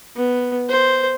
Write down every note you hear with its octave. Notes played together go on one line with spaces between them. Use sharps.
B3
C5